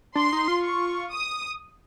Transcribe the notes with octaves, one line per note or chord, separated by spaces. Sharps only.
D4 C6
D#4
F4
C#6
D#6